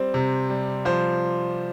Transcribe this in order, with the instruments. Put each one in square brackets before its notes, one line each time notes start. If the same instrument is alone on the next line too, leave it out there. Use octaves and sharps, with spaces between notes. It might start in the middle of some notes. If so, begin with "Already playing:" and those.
Already playing: [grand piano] G3 C4 C5
C3
G3
F3 C5